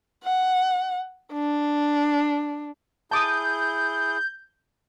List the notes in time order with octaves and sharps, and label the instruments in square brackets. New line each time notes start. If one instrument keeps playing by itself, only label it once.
[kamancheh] F#5
D4
[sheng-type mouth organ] E4 G#4 [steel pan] A5 D6 D#6 [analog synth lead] G6